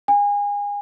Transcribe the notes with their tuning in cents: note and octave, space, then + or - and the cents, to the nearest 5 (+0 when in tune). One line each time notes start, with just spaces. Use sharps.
G#5 -30